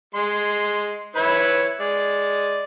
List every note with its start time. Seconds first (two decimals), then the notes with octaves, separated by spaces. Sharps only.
0.15 G#3 C6
1.16 E4 B4 C#5
1.80 G#3 D5